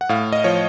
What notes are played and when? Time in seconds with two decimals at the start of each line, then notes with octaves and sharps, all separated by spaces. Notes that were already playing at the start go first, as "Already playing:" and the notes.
0.01 F#5
0.09 A2 F5
0.33 D#5
0.44 F3 C#5